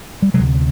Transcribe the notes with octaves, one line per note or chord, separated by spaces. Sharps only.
G3
C3 F#3 G#3
D2